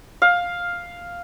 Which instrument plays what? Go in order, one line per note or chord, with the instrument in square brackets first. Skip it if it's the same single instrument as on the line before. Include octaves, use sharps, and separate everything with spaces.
[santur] F5